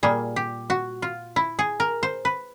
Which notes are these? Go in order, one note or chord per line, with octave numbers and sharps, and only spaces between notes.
A#2 G3 A#3 G#4
G4
F#4
F4
E4
G#4
A#4
C5
B4